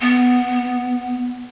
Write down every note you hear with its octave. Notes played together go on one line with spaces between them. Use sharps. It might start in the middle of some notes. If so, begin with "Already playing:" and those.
B3